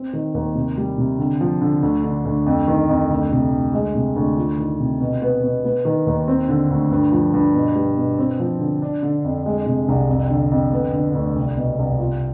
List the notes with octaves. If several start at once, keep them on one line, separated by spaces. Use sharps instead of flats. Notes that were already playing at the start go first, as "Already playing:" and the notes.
Already playing: C4
D#3
D#2
C3
G3
C3
D3
F3
D3
D2
D3
D2
F2
D#3
F2
D2
C3
D2
G#3
C3
D2
F4
D#3
C3
B2
B3
B2
B3
D#3
D#2
C4
D3
D2
G2
F3
G2
B2
G3
B2
C4
F3
D3
D4
D3
F2
G#3
C3
C2
F2
D3
F2
B3
D3
D2
C2
B2
C2
F4